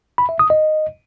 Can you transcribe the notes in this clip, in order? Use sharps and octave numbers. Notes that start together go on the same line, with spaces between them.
B5
E5
D#6
D#5